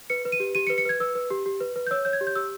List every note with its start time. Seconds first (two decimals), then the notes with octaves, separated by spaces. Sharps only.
0.10 B4 C#7
0.25 B4
0.32 D#7
0.40 G4
0.55 G4 D#7
0.67 C#7
0.70 B4
0.78 C#7
0.85 B4 G#6
1.00 B4 E6
1.15 B4
1.30 G4
1.46 G4
1.60 B4
1.76 B4
1.87 G6
1.91 C#5 E6
2.05 C#5 G6
2.13 G#6
2.21 G4
2.27 G6
2.36 G4 E6